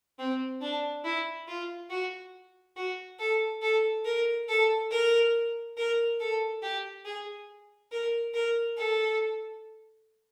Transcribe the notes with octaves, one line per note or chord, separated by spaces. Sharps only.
C4
D4
E4
F4
F#4
F#4
A4
A4
A#4
A4
A#4
A#4
A4
G4
G#4
A#4
A#4
A4